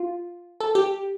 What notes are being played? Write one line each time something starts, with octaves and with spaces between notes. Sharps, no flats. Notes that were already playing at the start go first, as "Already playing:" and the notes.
Already playing: F4
A4
G4